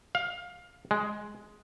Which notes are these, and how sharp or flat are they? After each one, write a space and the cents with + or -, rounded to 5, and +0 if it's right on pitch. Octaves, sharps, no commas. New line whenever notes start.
F5 +20
G#3 +5